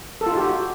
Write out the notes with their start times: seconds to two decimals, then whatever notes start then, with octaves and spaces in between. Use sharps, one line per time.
0.21 A4
0.26 F4
0.32 D#4
0.37 G4
0.42 F#4